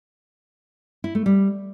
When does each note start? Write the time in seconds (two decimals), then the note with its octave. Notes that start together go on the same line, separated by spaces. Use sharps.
1.04 E4
1.15 A3
1.26 G3